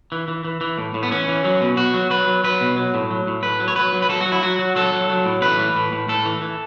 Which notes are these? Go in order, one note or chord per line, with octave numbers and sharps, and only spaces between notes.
E3
E3
E3
E3
A2
A2
B3
E3 C#4
E3
F#3
B2
B2 F#4
F#3
F#3 B4
F#3
F#3 B4
B2
F#3
A2
F#3
A2
A2 B4
F#3
C#5
F#3 B4
F#3
B4
F#3 A4
F#4
F#3
E4
F#3 F#4
F#3
F#3 A4
F#3
F#3
A2
A2 B4
E3
A2
A2
A2 A4
E3
E3